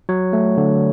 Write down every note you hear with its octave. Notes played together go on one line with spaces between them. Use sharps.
F#3 C#5
A3
D3